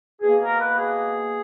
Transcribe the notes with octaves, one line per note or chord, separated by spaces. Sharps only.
B2 A#3 G#4
A#4
B4
G#4